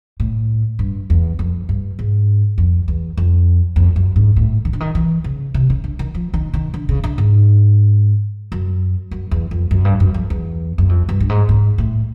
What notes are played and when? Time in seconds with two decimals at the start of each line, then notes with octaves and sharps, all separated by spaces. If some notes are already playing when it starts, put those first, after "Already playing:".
0.20 A2
0.79 G2
1.10 E2
1.39 F2
1.69 G2
1.99 G#2
2.58 F2
2.88 E2
3.17 F2
3.76 F2
3.96 F#2
4.16 G#2
4.36 A2
4.65 D#3
4.73 D3
4.80 D#3
4.95 E3
5.24 C#3
5.54 C3
5.70 C#3
5.84 D3
5.99 D#3
6.15 F3
6.34 D#3
6.54 D#3
6.74 D3
6.89 C#3
7.04 D3
7.18 G#2
8.52 F#2
9.11 F#2
9.31 E2
9.51 F2
9.71 F#2
9.85 G2
10.00 F#2
10.14 F2
10.30 E2
10.78 F#2
10.89 F2
11.09 G2
11.20 G2
11.29 G#2
11.49 G#2
11.78 A2